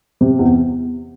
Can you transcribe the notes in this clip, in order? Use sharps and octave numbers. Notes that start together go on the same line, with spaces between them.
C3
E2